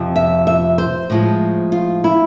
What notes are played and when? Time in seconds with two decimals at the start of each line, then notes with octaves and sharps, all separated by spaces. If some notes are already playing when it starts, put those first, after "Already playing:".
Already playing: F2 C3 F3
0.16 E5
0.47 E5
0.78 C5
1.10 A2 F3 G#3
1.72 F4
2.04 E4